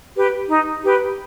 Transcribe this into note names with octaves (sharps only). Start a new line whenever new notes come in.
G4 B4
D#4
G4 B4